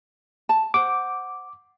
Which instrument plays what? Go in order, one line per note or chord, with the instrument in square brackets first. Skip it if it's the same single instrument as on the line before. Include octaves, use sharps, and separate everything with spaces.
[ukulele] A5
[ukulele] C5 F#5 [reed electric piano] D6